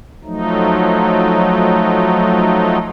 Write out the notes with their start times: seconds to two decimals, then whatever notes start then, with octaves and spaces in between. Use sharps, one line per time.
0.25 F3 F#3 A3 D#4